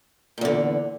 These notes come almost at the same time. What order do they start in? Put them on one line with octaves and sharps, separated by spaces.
A#2 E2 D3